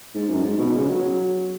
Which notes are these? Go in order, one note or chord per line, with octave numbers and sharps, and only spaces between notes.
G#2
F#2
G#2
B2
C#3
F#3
F#3